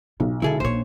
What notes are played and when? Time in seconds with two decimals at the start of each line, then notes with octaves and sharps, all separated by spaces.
0.20 B1 F4
0.42 D3 G#3 E4 G#4 A4
0.60 A#1 A#2 C5 C#5